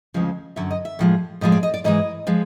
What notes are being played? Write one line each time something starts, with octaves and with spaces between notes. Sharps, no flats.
D2 C#3 F3 G#3
F#2 D3 F#3 E5
D#5
E5
A2 F3 G#3
A2 F3 G#3 D#5
D5
D#5
D5
G#2 E3 G#3 D#5
F3 G#3